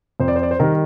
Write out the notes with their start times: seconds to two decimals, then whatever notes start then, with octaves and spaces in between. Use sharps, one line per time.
0.20 F2 C5
0.28 D5
0.36 C5
0.43 D5
0.51 C5
0.59 D#3 G3 A#4